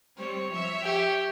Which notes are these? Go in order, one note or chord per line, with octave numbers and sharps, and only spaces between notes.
G3 C4 C#5
F3 E5
G4